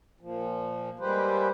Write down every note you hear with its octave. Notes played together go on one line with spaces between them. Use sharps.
A#2 F3
G3 G#3 A#3 G4 B4 C5